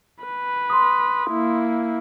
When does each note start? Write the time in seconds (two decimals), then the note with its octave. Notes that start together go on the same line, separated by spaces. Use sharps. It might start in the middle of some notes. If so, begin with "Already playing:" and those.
0.25 B4
0.70 C6 D#6
1.30 A#3 E4